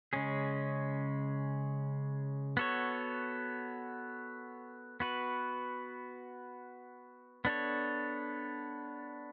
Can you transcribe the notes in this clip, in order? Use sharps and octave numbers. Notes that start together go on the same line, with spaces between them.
C#3 G#3 C#4 G#4
B3 F#4 A4 C#5
B3 F#4 B4
B3 D4 A4 C#5